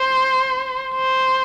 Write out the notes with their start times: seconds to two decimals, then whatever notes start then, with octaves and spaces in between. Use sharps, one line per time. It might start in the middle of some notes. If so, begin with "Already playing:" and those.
Already playing: C5
0.95 C5